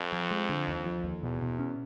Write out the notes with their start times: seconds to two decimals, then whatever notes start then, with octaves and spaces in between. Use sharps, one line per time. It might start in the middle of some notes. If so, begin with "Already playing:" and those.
Already playing: F2
0.13 F3
0.31 G#3
0.49 D3
0.68 D#2
0.86 F3
1.04 D#2
1.22 E2 B2
1.42 B2
1.59 C#4